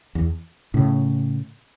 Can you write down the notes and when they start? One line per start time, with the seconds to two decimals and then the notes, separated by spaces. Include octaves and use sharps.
0.15 E2
0.74 A2 C#3